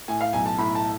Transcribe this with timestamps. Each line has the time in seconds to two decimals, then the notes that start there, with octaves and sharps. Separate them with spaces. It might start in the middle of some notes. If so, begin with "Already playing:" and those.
0.08 A2 G#5
0.21 F5
0.33 B1 G#5
0.46 A5
0.59 A2 B5
0.75 A5